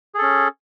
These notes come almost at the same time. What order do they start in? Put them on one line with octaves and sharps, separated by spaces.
G#4 A4 C#4